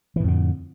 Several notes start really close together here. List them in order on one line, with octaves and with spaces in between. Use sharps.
E3 A2 F2 D3